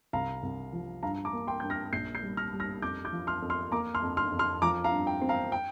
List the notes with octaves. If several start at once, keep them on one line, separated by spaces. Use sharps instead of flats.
C2 F5 A#5
C2
F3
G2 F5 A#5
A#5 D6
A#3
G5 C6
G2 G6
F6 A#6
A#1 G6 C7
G6 C7
G3
F6 A#6
G3
F6 A#6
F2 D6 G6
D6 G6
F3
C6 F6
F2
C6 F6
A#3 A#5 D6
C6 F6
F2
C6 F6
F2
C6 F6
F3 A#5 D6
F5 A#5
G2
G5
C4
F5 A#5
G5